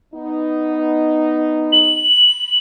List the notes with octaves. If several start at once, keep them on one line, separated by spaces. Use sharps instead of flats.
B3 D#4
F#7